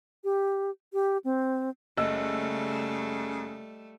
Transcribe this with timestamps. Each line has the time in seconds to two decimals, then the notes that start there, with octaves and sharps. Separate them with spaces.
0.24 G4
0.93 G4
1.24 C4
1.97 F#1 C#3 G3 A3 D#5 E6